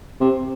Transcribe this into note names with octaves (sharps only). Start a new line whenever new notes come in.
C3